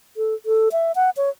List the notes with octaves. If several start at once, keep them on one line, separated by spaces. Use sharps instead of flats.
A4
A4
E5
F#5
C#5